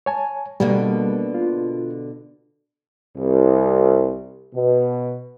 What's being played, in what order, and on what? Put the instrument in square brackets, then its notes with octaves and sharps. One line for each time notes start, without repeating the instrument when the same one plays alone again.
[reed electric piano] C#5 G#5 A5
[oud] B2 D3 A#3 [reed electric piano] G3
[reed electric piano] F4
[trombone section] C2
B2